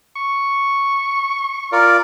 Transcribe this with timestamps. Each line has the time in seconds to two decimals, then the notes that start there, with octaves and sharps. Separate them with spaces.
0.16 C#6
1.72 F4 A#4 D5